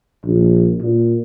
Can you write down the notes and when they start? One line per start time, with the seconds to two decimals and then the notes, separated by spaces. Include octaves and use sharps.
0.24 A#1
0.80 A#2